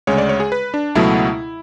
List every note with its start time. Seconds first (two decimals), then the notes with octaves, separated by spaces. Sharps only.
0.07 D2 C#3 G#3 C#5
0.18 D5
0.29 C#5
0.40 G#4
0.52 B4
0.74 D4
0.95 C#2 B2 F#3 A3 E4